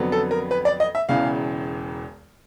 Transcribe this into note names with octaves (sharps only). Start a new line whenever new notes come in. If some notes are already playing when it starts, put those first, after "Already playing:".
Already playing: F2 D3 F#3 B3
A4
A#4
B4
D5
D#5
E5
E1 E2 C#3 E3 F5